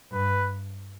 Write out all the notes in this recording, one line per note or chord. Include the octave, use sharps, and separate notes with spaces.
G2 B4